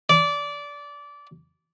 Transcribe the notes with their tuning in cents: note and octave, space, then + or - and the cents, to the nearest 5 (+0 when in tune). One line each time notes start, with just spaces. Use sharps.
D5 -20